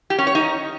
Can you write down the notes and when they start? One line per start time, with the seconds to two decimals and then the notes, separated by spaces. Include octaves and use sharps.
0.10 G4
0.18 C#4
0.27 C#5
0.35 D#4